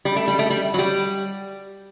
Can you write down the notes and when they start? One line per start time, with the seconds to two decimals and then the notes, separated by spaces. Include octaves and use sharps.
0.05 G3
0.16 A3
0.27 G3
0.39 A3
0.50 G3
0.74 F#3
0.79 G3